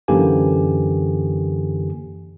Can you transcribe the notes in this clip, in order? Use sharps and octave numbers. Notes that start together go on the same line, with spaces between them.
F#2 D3 E3 A#3 G4 G#5